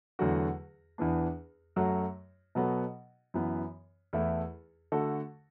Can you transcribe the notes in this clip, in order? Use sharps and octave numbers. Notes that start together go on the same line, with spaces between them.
E2 D3 F#3 A3 F#4
E2 E3 B3 D4
F#2 F#3 A3 F#4
B2 F#3 B3 F#4 A4
F#2 E3 B3
E2 E3 A3 E4 A4
D3 A3 F#4 A4